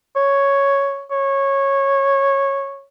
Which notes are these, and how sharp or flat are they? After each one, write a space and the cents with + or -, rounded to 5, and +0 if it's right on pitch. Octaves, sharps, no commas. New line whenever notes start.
C#5 +0
C#5 -15